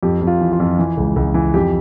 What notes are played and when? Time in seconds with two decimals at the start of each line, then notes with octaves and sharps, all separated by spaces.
0.03 F2 G4
0.22 F2
0.27 F4
0.41 E3
0.52 F4
0.60 F2
0.79 E3
0.97 C#2
1.16 C#2
1.34 E3
1.54 F2 G4